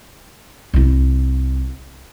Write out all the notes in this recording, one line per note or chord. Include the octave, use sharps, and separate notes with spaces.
C2 E4